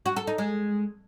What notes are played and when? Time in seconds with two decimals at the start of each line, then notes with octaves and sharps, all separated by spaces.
0.06 F#4
0.16 A4
0.27 D#4
0.38 G#3